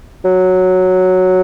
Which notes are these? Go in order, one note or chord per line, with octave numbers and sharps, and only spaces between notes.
F#3